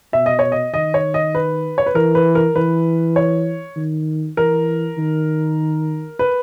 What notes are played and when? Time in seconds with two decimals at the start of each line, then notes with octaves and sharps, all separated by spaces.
0.13 B2 E5
0.26 D#5
0.39 C#5
0.52 D#5
0.74 D#3 D#5
0.94 C#5
1.14 D#5
1.35 B4
1.78 C#5
1.86 B4
1.95 E3 A#4
2.15 B4
2.35 A#4
2.56 E3 B4
3.16 C#5
3.76 D#3
4.37 E3 A#4
4.98 D#3
6.19 B4